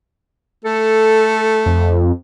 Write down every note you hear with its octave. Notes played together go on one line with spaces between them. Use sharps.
A3 A4
F2